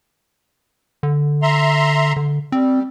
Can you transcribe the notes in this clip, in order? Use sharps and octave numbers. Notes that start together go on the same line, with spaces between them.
D3
E5 A#5 C6
D3
G3 C4